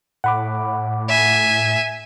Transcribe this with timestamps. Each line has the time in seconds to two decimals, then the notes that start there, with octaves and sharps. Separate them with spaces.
0.24 A2 F#5 B5 D6
1.09 E5 G#5